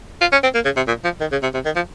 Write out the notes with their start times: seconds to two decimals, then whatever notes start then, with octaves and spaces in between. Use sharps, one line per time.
0.21 F4
0.32 C#4
0.43 C4
0.54 A#3
0.65 C#3
0.76 C3
0.87 A#2
1.04 F3
1.21 D#3
1.32 C#3
1.43 C3
1.54 C3
1.65 D#3
1.76 F3